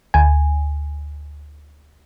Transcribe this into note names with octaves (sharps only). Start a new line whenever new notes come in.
D2 G#5